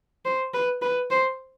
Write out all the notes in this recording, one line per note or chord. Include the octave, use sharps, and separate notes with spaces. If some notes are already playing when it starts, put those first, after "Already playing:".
C5
B4
B4
C5